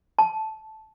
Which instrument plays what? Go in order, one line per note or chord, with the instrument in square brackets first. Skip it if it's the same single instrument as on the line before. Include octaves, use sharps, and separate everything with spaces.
[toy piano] A5